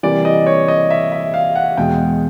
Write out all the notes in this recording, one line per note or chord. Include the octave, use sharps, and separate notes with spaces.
C3 E3 G3 A#3 D5
D#5
C#5
D#5
E5
E5
F5
F#5
E2 B2 G#3 G5